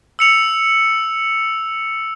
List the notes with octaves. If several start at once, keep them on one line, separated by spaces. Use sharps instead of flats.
E6 C#7 F7